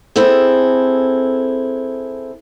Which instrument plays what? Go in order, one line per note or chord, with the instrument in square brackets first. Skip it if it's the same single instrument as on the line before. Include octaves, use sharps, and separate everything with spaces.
[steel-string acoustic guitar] C4 E4 G#4 A4